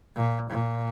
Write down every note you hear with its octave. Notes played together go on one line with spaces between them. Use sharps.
A#2
A#2